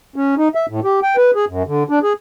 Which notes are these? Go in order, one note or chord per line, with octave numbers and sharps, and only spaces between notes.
C#4
D#4
E5
A2
G4
G5
B4
G#4
F#2
D3
D4
G#4